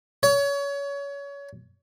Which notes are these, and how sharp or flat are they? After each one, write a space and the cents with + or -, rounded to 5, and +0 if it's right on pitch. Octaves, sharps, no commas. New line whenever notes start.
C#5 +25